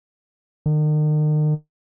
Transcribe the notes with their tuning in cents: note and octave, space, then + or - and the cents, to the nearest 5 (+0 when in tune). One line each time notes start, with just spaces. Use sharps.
D#3 -40